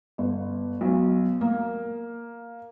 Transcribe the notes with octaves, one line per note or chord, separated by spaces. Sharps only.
G1
B1
A#3